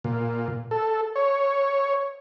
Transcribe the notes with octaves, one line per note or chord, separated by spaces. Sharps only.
A#2
A4
C#5